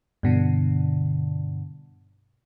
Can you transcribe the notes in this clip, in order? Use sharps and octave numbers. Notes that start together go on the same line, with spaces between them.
G2 B2 D3